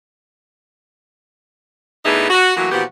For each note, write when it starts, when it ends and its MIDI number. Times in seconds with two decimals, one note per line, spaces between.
2.05 2.26 45
2.05 2.26 59
2.05 2.26 62
2.05 2.26 63
2.05 2.26 68
2.05 2.26 76
2.30 2.53 66
2.57 2.68 52
2.57 2.68 54
2.57 2.68 57
2.57 2.68 58
2.57 2.68 66
2.71 2.83 46
2.71 2.83 52
2.71 2.83 53
2.71 2.83 59
2.71 2.83 66
2.71 2.83 67